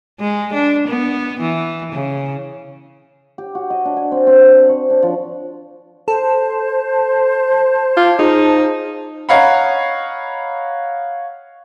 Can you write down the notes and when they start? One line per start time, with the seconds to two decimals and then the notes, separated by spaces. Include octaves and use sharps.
0.20 G#3
0.54 D4
0.88 B3
1.40 E3
1.93 C#3
3.38 G4
3.55 F#4
3.70 D#5
3.85 D4
3.97 G#5
4.12 C4
4.27 C4
4.46 C5
4.69 C#6
4.90 D4
5.03 F3
6.08 A4 C5 A5
7.97 F4 D6 G#6
8.19 D#4 F4 G#4
9.29 C#5 D#5 F5 F#5 A#5 B5